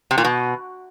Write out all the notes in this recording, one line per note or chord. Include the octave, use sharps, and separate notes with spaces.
C3
A#2
B2